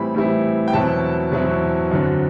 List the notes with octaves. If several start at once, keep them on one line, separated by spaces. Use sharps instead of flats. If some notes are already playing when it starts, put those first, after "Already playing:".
Already playing: A2 E3 G3 C4 E4 B5
A2 E3 G3 C4 E4
G5
E2 B2 F#3 C4 E4 A5
E2 B2 F#3 C4 E4
F#2 D3 F#3 C4